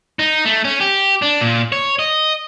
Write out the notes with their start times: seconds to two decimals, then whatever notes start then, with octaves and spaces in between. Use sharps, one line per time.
0.19 D#4
0.45 A3
0.65 C#4
0.80 G4
1.22 D4
1.41 A#2
1.72 C#5
1.99 D#5